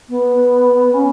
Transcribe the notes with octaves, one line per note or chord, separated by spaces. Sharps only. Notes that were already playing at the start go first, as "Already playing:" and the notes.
B3
C#4